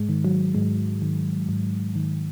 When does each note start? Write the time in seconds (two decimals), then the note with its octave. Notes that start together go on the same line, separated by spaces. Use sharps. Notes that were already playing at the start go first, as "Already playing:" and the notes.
Already playing: G#2 G#3
0.09 D#3
0.25 F#3
0.55 G#2 G#3
1.02 D#3
1.49 G#2
1.96 D#3